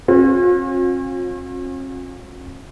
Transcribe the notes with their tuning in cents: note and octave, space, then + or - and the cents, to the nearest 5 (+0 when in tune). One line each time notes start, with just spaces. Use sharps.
C#4 -45 F4 +45